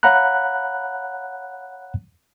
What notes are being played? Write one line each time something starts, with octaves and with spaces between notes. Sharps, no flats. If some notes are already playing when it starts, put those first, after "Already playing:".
C#5 F5 F#5 A#5 B5 F#6